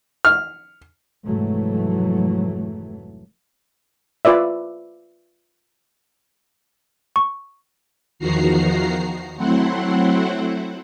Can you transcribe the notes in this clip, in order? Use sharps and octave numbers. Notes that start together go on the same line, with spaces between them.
F6
F1 G#2 E3 F#3 A3
F4 B4 D5 E5
C#6
E2 D#3 F3 F#4 A#5 C7
F#3 A3 C4 E4 C5 F#5